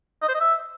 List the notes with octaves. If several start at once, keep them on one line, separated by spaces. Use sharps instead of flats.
D#5
C5
D#5
E5